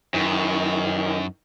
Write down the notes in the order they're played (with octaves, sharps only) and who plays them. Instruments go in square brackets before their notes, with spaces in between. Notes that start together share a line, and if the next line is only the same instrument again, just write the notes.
[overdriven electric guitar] F#2 [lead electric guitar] D#3 E3